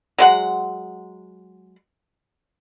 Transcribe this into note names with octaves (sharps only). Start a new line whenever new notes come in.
F#3 G#3 F#5